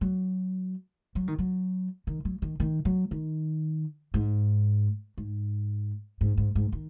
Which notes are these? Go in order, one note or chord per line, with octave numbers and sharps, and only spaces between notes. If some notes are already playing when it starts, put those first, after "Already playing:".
F#3
F#3
D#3
F#3
D#3
F#3
D#3
D#3
F#3
D#3
G#2
G#2
G#2
G#2
G#2
D#3